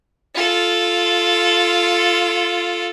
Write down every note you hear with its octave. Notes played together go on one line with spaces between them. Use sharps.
F4 A4